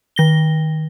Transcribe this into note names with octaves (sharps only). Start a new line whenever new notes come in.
D#3 A#6 G7